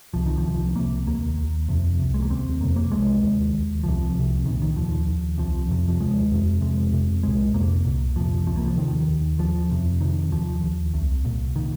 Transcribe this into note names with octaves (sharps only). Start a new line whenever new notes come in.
C2 C3 F3
D#3
F3
C2 C3
C2 C3 A#3
D#2 A#3
D#2
F2 C3
C2 C3
G#3
A#3
D#2 C4
F2 C3 A#3
A#3
C2 C3 G#3
D#2
D#2
C2 C3 F3
C2 C3
C2 A#2 D#3
D#3
D#2 F3
D#2
C2 C3 F3
F2 C3
F3
D#2 G#3
F2 C3
F2 C3 G#3
F2 C3
C2 A#2 G#3
F2 C3 A#3
C2 A#2
F2 C3 F3
C2 C3 F3
A#3
F3
D#2 D#3
D#2
D#2 F3
F2 C3
F2 C3 D#3
D#2 F3
D#2
C2 C3
C2 A#2
A#2 D#3